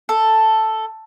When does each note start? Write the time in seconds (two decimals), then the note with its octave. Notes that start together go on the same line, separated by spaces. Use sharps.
0.09 A4